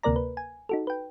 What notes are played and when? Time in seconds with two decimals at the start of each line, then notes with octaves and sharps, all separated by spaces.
0.03 D2 C3 A#3 A#4 D5 A#5
0.16 B4
0.37 G#5
0.69 D#4 F#4 A4
0.87 B4 G5